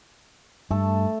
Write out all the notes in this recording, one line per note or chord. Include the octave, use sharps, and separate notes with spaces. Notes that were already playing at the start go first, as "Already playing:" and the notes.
G2 A3 A4